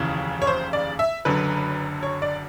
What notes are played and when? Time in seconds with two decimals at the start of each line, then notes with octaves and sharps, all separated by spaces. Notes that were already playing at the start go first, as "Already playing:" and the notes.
Already playing: F1 D#2 C#3 E3
0.42 C#5
0.47 C5
0.73 D5
0.99 E5
1.25 F#1 F#2 D3 B4
2.03 C#5
2.22 D5